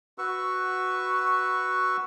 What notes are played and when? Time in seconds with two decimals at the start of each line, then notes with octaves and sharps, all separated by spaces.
0.18 F#4 B4 C#6 E6